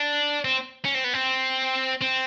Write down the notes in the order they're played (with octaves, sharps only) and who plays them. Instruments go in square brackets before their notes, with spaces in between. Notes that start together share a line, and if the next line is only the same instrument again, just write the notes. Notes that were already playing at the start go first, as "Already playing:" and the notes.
Already playing: [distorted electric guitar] D4
C4
C#4
C4
B3
C4
C4